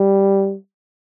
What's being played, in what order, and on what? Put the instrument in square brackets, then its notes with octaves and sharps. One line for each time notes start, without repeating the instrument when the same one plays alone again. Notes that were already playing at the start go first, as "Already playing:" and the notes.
Already playing: [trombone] G3